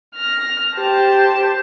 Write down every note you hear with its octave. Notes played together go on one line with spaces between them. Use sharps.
F6 A#6
G4 C5 A5